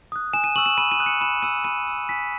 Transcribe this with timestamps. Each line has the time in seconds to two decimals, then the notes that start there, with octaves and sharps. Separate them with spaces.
0.12 D#6 F#6
0.33 G#5 E7
0.44 D#7
0.56 C#6 E6 F#7
0.66 E7
0.77 B5 D#7
0.92 D#7
0.99 D#6 F#6
1.06 C#7
1.21 B5 E7
1.42 E6 D#7
1.64 B5 D#7
1.87 E6
2.09 G#5 B6